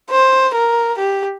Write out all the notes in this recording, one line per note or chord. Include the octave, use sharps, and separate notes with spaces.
C5
A#4
G4